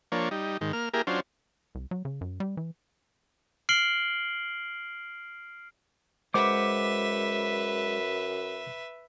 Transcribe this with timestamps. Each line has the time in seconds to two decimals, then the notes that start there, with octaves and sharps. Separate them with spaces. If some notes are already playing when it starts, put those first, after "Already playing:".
0.12 F3 A#3 D4 C#5
0.31 G3 D#4
0.61 G#2 D#3
0.73 A#3 F6
0.94 A#3 E4 G4 G#4 A#4
1.07 F#3 C#4 D4 F4 C5
1.75 C2
1.91 F#3
2.05 C#3
2.21 F#2
2.40 G3
2.57 E3
3.69 F6 C7 D7 F#7 G7
6.34 F#2 G#3 B4 C5 E5 F#5 D6